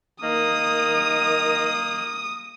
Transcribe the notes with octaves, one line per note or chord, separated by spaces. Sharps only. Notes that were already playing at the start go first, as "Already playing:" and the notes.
D#3 A#3 D#6